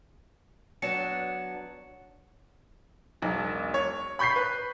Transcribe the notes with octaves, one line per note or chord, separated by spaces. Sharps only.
F#3 B3 D4 C#7 E7
E1 B1
C#5
B5 C#6 G6 B6 C7
B4